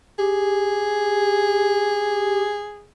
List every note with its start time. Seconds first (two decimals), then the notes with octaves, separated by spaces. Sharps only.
0.19 G4 G#4